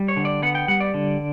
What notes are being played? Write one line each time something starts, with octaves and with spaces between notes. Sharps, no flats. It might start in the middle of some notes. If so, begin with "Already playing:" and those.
Already playing: G3
C#5
D3
D5
B3 F#5
G5
G3 F#5
D5
D3